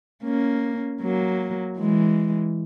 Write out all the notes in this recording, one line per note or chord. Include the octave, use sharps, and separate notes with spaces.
A#3 C#4
F#3 A#3
E3 G#3